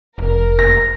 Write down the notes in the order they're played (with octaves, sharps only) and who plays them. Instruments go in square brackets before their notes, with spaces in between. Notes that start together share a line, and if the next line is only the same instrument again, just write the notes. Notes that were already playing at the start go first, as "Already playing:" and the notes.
[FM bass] F1 [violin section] A#4
[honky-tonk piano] A#6